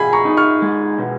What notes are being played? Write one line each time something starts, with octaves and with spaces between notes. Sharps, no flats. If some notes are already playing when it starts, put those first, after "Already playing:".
Already playing: B2 G#4 G#5 B5
A#5 C#6
D#4
C#6 F6
G#3
B2